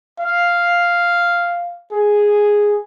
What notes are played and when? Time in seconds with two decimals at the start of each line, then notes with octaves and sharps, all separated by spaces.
0.20 F5
1.92 G#4